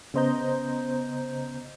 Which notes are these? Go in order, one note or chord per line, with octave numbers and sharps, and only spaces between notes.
C#3 B3 C5 D#5 A#5 G6